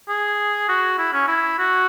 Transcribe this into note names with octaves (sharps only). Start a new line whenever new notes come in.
G#4
F#4
E4
C#4
E4
F#4